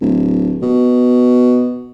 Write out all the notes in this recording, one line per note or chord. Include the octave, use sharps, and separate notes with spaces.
D1
B2